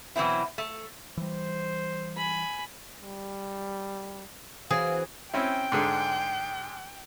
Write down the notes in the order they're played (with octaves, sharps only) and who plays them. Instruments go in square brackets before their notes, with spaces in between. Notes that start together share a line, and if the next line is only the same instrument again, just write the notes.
[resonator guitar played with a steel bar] B2 E3 F#3 C4 E4
A3
[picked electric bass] E3 G3 [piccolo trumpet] C5
[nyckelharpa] G#5 B5
[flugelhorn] G3
[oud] E3 F#3 C4 [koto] G#4 [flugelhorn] F5
[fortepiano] C4 C#4 E4 [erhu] G5
[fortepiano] G#2 D3 G#4